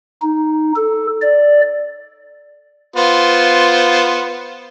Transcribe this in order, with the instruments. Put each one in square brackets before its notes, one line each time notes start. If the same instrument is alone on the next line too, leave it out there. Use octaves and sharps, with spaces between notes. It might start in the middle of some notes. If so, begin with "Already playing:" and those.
[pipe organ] D#4
A4
D5
[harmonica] B3 F4 C5